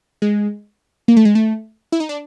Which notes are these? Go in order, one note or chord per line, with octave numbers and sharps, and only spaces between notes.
G#3
A#3
A3
G#3
A3
E4
D#4
D4